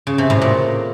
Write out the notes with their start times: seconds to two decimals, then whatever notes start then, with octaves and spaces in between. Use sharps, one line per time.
0.07 C#3
0.18 C3
0.30 A2
0.42 A#2